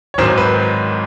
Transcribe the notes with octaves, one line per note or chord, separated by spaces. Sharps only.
C#5
G#1 G#2 D#3 F#3 C5
B4